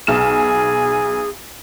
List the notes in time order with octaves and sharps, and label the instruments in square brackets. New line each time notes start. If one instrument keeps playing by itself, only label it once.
[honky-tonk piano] B1 F6 E7 [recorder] G#4